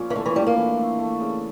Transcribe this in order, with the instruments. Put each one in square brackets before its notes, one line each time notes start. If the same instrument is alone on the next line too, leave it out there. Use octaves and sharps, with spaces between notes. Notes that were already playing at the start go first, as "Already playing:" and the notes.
Already playing: [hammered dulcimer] A#2 F3 C#4
[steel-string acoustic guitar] E3
[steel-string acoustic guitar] D3 [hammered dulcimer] A3
[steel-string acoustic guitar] E3
[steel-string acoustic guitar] G3 [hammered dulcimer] D4
[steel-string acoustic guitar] A#3
[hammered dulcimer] E3
A3
A3
C#3